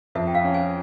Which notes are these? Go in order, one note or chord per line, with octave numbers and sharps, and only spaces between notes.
F2 E5
G5
F5
C#4
G#5